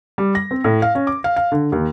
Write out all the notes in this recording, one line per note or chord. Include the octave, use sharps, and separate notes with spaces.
G3
A#6
C4
A2
F5
C#4
D6
F5
F5
D3
D#2